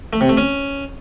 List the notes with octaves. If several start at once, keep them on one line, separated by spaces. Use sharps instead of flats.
A3
C3
A3
C#4